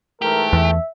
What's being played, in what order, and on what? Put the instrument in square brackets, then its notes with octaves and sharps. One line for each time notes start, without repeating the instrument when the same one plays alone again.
[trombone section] G#2 E3 A3 [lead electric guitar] G4 [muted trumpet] A#4
[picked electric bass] E2 [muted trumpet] E5